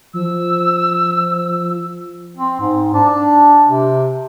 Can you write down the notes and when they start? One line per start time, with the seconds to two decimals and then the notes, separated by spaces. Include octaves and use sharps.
0.14 F3 E6
2.37 C4
2.60 G#2
2.94 D4
3.68 C3